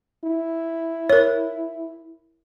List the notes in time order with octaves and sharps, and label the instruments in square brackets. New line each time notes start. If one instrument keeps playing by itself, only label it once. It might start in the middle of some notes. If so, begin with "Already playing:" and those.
[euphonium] E4
[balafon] A#4 C#5